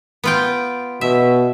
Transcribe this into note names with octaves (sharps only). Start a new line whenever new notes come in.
B3 F4 G5
B2 E5